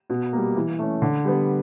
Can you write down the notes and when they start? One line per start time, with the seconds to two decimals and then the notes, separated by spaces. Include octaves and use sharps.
0.10 B2
0.33 G3 A#3
0.56 E3
0.79 A3 C#4
1.02 D3
1.25 G3 B3